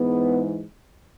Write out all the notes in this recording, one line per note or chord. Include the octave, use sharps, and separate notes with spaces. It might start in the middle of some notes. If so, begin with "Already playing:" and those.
Already playing: G#2 E3 G#3 B3